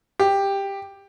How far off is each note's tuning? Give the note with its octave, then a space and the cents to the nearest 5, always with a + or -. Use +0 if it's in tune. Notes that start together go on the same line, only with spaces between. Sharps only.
G4 +10